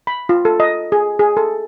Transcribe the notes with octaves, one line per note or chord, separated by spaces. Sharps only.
B5
F4
A4
D#5
G#4
G#4
A4